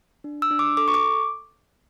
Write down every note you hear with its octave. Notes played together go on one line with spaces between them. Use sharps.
D4
E6
D4
D6
A4 D6
C#6
D6